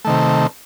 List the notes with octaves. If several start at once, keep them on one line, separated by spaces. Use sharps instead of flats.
C3 D#3 A3